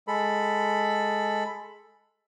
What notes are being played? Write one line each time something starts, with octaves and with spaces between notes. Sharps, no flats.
G#3 A4 B5